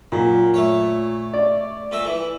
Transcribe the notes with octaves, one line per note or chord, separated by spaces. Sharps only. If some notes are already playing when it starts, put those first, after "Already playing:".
F#2 A#2
A3 C#5
D5
A#2 A3 E5
E3